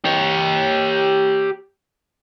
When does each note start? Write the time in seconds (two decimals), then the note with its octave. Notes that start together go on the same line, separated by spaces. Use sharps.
0.05 G4 C#5